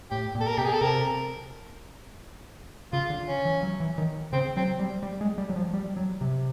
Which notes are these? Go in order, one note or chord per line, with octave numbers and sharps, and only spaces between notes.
A2 G4
A#2
A4
A#4
B2 G4
G#4
A4
C3 A#4
C#3 F4
D3
C#4
E3
F#3
E3
D#3
C#3 C4
F#3 C4
G3
G3
G#3
G3
F#3
F3
G3
F#3
C3